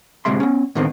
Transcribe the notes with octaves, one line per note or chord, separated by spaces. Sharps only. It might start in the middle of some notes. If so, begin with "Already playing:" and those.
D2 A2 C3 G#3 E5 C6
B3 C#4
A2 D3 D#3 B3 C4